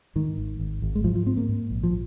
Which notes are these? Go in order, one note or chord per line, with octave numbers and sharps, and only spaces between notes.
G#2 D#3
G#1
G#1
G#1
G#3
G#2 F3
F3
G#2 C4
A#3
G#2
A#1
F3